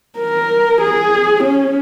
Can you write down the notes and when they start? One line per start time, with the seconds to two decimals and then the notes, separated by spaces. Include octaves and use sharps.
0.18 A#4
0.81 G#4
1.43 C#4